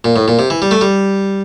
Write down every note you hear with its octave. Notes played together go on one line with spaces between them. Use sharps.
A#2
A2
A#2
C3
E3
G3
A3
G3